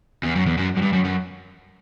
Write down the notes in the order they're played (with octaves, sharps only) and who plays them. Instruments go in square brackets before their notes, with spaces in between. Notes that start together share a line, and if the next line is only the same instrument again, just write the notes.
[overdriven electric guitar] E2
F#2
E2
F#2
F#2
G2
F#2
F#2